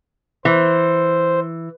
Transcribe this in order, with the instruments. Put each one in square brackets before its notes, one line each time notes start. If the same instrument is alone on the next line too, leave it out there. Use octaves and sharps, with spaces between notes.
[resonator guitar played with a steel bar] E3 [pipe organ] C5